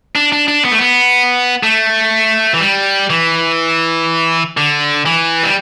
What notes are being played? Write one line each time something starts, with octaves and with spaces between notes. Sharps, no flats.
D4
D4
D4
B3
A3
B3
A3
E3
G3
E3
D3
E3
G3